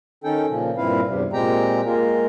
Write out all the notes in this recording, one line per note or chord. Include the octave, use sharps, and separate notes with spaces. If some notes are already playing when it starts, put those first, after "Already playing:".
D#3 C#4 D#4 A4 G5
A#2 C#3 F3
G2 A#2 C4 E4 B4 F5
E2 G2 C3
A#2 G#3 C4 G4 G5 A#5
G#3 A#3 F4 A#4